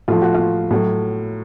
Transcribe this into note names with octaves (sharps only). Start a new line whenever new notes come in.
A2 F3 F4
F#4
F4
A2 F#3